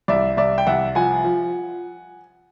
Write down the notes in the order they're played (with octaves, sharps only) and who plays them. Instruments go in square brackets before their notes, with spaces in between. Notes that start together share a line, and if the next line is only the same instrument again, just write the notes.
[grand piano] C2 D5 E5
C2 D5 E5
G5
C2 E5 F#5
F3 F#5 G#5
F3